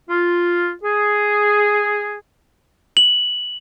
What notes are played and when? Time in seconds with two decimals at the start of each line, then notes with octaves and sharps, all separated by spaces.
0.09 F4
0.84 G#4
2.97 F#7